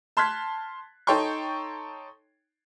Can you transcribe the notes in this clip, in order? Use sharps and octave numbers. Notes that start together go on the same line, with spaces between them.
A5 C6 F6 F#6 G#6 B6
D#4 A4 C#5 G5 C6 C#6